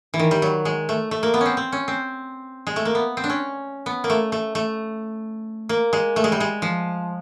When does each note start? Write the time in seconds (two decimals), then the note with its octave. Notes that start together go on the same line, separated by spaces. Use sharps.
0.14 E3
0.19 D#3
0.31 G3
0.42 F#3
0.65 G#3
0.89 A3
1.11 A3
1.23 A#3
1.34 B3
1.41 C4 C#4
1.57 C4
1.72 C#4
1.88 C4
2.67 G#3
2.76 A3
2.85 A#3
2.95 B3
3.17 C4
3.24 D4
3.30 C#4
3.86 B3
4.04 A#3
4.10 A3
4.32 A3
4.55 A3
5.69 A#3
5.93 G#3
6.16 A3
6.24 G#3
6.32 G3
6.40 G#3
6.62 F3